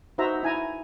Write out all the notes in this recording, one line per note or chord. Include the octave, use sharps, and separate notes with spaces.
D#4 F#4 C5 E5 A#5
E4 G#5 A#5